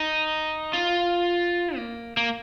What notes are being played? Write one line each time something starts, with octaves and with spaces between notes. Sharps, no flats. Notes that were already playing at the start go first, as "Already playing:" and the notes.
Already playing: D#4
F4
A#3
A#3